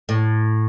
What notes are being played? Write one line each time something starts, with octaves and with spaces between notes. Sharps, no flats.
A2